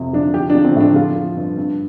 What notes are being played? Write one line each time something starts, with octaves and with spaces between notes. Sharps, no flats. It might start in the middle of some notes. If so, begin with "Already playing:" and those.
Already playing: F2 C3 F3
F3 D4
F3 G4
D4
F3
C4
A2 D4
F3 F4
F3
G2
G2